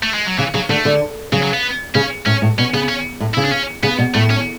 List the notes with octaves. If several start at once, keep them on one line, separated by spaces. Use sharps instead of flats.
A3
G#3
F#3
C#3 E3
C#3 F#3
D3 A3
D3
C#3 F#3
F#3
B3
C#3 C#4
A2 C#4
A2
B2 C#4
C#3 B3
C#4
A2
C#3 E4
D4
C#4
C#3 B3
B2
A2 A3
C#4